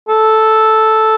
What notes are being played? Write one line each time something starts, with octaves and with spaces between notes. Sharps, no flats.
A4